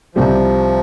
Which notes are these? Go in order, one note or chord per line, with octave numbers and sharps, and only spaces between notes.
C2 C3 F3 G3